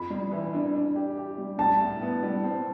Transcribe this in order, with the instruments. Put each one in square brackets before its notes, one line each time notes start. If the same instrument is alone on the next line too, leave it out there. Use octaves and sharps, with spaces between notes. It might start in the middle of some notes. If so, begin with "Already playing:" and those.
Already playing: [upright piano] F2 [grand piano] B5
[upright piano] G3
E3
D4
D4
G4
G4
G3
[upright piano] G3 [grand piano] A5
[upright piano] A2
B3
G3
C4